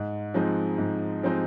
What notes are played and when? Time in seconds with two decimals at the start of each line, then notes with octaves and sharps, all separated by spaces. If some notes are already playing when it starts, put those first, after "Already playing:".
Already playing: G#2
0.34 F3 G#3 C4 D#4
0.78 G#2
1.23 F3 G#3 C4 D#4